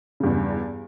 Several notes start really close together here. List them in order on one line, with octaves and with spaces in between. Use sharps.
C#3 G2 E2